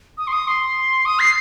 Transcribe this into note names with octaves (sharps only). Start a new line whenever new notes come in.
D#6
C6
D#6
C6
D#6
C7